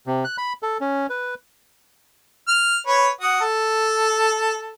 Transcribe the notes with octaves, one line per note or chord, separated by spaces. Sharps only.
C3
F#6
B5
A4
C#4
B4
F6
B4 C#5
F#4 F#5 D#6
A4